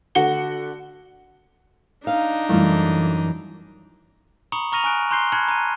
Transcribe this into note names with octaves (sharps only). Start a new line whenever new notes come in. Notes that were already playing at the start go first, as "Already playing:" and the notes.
D3 A3 F#4 F#5 C#7 G7
D4 D#4 F5
F#2 E3 G3 A3 E4 F4
A#5 B5 C#6 D#6 C#7 F#7
A#5 C#6 F6 A#6 D#7 F7
G#5 C#6 F6 F#6 D7
A#5 C6 F#6 G6 C7 G7
A5 B5 F6 F#6 G#6 C#7
A#5 F#6 D#7